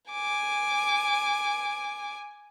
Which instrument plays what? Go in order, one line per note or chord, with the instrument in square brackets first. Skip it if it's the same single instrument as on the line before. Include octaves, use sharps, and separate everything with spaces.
[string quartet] G#5 D6